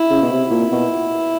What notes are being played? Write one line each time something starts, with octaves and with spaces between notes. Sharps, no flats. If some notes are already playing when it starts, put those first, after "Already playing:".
Already playing: E4
C#3
B2
C3 E4
A#2
B2